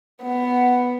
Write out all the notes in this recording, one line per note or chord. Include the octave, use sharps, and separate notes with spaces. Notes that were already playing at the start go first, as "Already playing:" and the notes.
B3